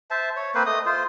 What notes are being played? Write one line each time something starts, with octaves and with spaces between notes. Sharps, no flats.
C5 E5 A5
C#5
A#3 C4 B4 C5
A3 D#5 D#6
F4 C5